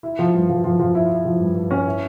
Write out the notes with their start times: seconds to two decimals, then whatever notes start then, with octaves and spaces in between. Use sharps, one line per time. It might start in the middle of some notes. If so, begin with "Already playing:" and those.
0.03 E4
0.19 F3
0.34 G2
0.49 F3
0.64 F3
0.79 F3
0.95 E4
1.10 E4
1.25 F3
1.40 G2
1.55 G2
1.71 C#4
1.86 E4